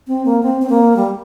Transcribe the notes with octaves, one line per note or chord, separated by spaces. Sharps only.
C4
A#3
C4
C4
A#3
G3